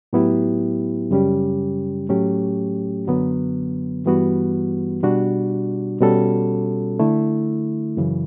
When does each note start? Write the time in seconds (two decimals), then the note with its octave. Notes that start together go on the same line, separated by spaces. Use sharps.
0.13 A2 F#3 B3 E4 G4
1.11 F#2 C#3 G3 C#4 G4
2.09 A2 F#3 A3 C#4 G4
3.07 F#2 D3 F#3 B3
4.05 G2 E3 G3 B3 F#4
5.03 B2 G3 D4 F#4
6.01 B2 G3 C#4 F#4 A4
6.99 D3 A3 E4
7.97 F#2 C#3 E3